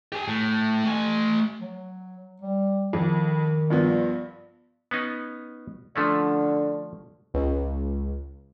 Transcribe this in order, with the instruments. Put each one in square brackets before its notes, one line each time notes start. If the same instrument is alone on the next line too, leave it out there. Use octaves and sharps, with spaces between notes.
[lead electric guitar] G4 G#5
A2
A3 G#5
[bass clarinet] F#3
G3
[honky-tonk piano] F2 [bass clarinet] D#3
[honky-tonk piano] G2 F3 B3
[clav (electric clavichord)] B3 C#4 D#4
[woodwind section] D3 [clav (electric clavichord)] F3 A3 C#4
[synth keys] C#2